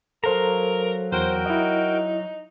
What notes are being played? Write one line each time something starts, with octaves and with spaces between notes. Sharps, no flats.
F#3 A4 A#4 C5 F5 A#5
E2 F#4 A#4 C5 G5
D#4 E4 D#5